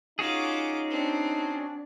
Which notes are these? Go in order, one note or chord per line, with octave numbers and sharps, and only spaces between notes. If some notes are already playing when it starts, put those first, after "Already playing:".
C#4 D#4 F4 F#4 G#4 D6
C4 D4